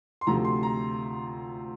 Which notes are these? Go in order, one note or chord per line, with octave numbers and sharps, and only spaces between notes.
C6
D2 C3 F3 A3 A#5
C6
A#5